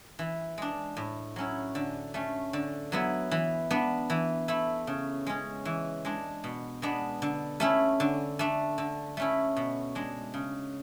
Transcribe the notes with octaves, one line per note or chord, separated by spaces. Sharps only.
E3
G#3 D4
A2
F#3 C#4 E4
D3
A3 C#4
D3
F#3 B3 E4
E3
B3 D4
E3
A3 E4
C#3
G#3 C#4
E3
G#3 D4
B2
G#3 B3 D4
D3
A3 C#4 E4
D3
A3 D4
D3
A3 C#4 E4
B2
G#3 D4
C#3